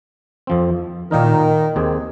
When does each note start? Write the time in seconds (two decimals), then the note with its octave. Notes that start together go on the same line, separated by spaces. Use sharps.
0.47 F2 F3 C4
1.11 A#2 D#3 A#3 D#4 A#4
1.76 D#2 D#3 C4 G#4